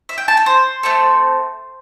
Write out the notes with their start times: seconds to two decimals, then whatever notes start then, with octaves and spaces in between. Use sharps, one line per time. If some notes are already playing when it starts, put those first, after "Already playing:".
0.09 E5
0.18 G5
0.28 A5
0.37 A4
0.46 C5
0.83 A3 C4 A4